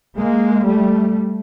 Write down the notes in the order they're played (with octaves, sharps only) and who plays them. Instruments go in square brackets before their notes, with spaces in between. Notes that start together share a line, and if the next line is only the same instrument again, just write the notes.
[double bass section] G#3 A#3
G3 A3